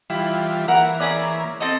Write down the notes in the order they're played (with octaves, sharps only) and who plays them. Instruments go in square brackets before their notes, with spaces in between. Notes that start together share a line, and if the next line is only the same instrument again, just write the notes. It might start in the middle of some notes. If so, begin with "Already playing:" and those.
[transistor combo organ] E3 G3 F4 [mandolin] E4
[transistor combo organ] E3 A#3 [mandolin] A#4 F#5
[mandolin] C#4 G#4 D5
C4 A4 D#5